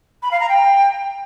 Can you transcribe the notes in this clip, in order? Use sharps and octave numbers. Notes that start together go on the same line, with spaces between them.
B5
F5
A#5
G5